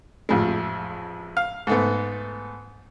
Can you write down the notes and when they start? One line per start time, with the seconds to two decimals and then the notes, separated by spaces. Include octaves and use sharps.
0.29 A1 F2 G#3
1.37 F5
1.67 G#2 A3 B3